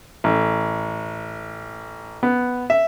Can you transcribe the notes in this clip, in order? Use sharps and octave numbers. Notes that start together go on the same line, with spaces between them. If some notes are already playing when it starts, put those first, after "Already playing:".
A1
B3
E5